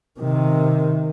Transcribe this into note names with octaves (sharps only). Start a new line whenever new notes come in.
C3 D#3